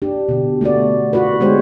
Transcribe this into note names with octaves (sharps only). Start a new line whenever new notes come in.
D4 G4
B2 D3
A3 B3 F#4 D5
F4 F#4 B4
D3 G#3 B3 G4 C5 C#5